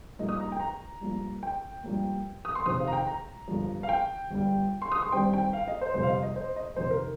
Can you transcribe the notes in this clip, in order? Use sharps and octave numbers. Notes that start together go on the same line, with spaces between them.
G2 F3 A#3 D#4 D#5
D#6
A#5
G5
A#5
G2 F3 A#3
G5
G2 F3 A#3
D#6
C6
F2 C3 D#3 C4 D#6
F5
A#5
G5
A#5
G1 G2 F3
F5
G5
G1 G2 G3
C6
D#6
C6
G2 D#3 G3 C4 G5
G5
F5
D#5
C5
G1 F2 C3 C5
F5
D#5
D#5
C5
D#5
F2 C3 D#3 C5
A#4